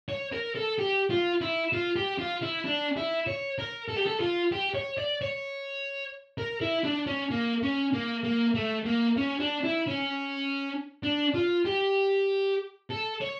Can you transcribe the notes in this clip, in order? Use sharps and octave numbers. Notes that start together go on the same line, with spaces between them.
C#5
A#4
A4
G4
F4
E4
F4
G4
F4
E4
D4
E4
C#5
A#4
A4
G4
A4
F4
G4
C#5
D5
C#5
A#4
E4
D4
C#4
A#3
C#4
A#3
A#3
A3
A#3
C#4
D4
E4
C#4
D4
F4
G4
A4
C#5